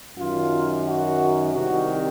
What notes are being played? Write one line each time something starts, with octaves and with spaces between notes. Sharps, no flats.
F#2 D#3 F4
F#4
C2 C3 D#3 F#4